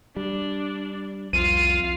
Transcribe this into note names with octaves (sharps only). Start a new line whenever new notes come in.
G3 D4
C2 F2 F4 F5 D#7